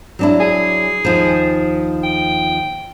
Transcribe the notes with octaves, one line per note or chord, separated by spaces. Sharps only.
F#3 D4 E4
G#4
D#2 F3
G5